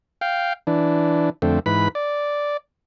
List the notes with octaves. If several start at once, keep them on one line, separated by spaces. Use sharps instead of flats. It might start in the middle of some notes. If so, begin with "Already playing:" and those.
F5 G5
E3 D4
F2 D3 A3 C4
G#2 E3 B4 B5
D5